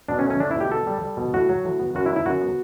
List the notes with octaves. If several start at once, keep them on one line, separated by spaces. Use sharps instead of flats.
B2 D4
C#4
A3
C#4
A3 D4
E4
B2 G4
B3 A4
G3
G3
B2
A2 F#4
F#3
A2
B3
F#2 F#4
E4
B3
E4
F#2 F#4
B3